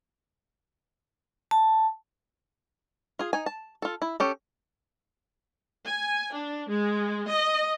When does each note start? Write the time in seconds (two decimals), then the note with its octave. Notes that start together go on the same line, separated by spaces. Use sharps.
1.51 A5
3.19 F4 G#4
3.33 D#4 G#5
3.46 A5
3.82 F4 A4
4.02 E4
4.20 C#4 G4 A4
5.88 G#5
6.34 D4
6.69 G#3
7.30 D#5